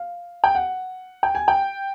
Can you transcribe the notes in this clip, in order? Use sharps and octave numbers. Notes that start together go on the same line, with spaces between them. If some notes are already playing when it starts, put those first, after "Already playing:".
Already playing: F5
G5
F#5
G5
G#5
G5